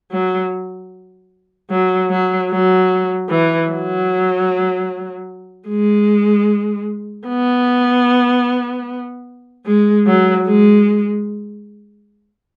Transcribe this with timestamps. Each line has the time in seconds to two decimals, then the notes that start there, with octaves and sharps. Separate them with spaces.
0.11 F#3
1.70 F#3
2.10 F#3
2.50 F#3
3.29 E3
3.70 F#3
5.68 G#3
7.28 B3
9.66 G#3
10.06 F#3
10.46 G#3